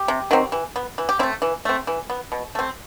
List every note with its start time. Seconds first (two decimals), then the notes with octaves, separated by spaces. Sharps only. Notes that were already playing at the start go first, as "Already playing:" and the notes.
Already playing: G4
0.08 C3
0.31 D#3 F#3 C4
0.52 E3
0.76 B3
0.98 E3
1.09 G4
1.19 C4 E4
1.23 A3
1.42 E3
1.65 A3 C4
1.87 E3
2.10 B3
2.32 B2
2.55 A3 C4